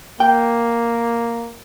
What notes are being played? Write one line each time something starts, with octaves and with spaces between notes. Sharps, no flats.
A#3 G5